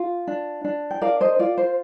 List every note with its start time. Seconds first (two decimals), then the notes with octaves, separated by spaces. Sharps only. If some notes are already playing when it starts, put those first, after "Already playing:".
Already playing: F4
0.27 D4
0.64 D4
0.91 G5
1.01 A#4 D5 F5
1.21 C5 D#5
1.39 F4 D5
1.58 C5